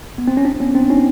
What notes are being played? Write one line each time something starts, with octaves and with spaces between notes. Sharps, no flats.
B3
C4
C#4
C4 D4
B3 C#4
C4 D4
C#4 D#4